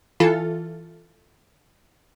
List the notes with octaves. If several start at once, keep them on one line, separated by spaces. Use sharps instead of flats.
E3 F4 A4